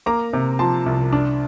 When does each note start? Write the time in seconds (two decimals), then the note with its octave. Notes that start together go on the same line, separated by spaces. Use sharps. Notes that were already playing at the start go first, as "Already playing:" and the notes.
0.06 A#3 A#5 D6
0.33 C3
0.59 F3 A5 C6
0.86 C2
1.13 D4